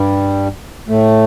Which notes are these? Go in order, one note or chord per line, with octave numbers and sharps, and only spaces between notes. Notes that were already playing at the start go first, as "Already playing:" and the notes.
Already playing: G2 G3
A2 A3